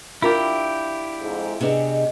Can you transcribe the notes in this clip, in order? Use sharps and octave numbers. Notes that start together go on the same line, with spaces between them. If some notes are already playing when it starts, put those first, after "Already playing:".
D4 E4 F4 G4 A#4
F2 G#2
C3 B3 D4 G#4 D#5